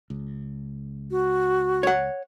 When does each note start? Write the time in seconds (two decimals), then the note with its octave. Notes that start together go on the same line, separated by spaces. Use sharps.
0.10 C#2
1.11 F#4
1.83 C#5 F#5